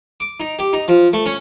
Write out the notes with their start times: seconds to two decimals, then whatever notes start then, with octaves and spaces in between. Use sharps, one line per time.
0.20 D6
0.40 D#4
0.59 G4
0.73 D#4
0.88 F3
1.13 A3
1.26 C#4